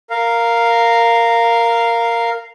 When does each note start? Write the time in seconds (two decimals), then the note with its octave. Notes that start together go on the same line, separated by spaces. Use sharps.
0.10 A#4 F5